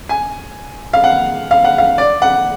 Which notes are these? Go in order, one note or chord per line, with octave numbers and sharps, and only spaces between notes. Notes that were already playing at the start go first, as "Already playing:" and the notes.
G#5
F5
F#5
F5
F#5
F5
D5
F#5